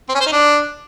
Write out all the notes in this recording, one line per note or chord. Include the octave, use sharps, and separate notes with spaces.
C4
C#4
C5
D#4
D4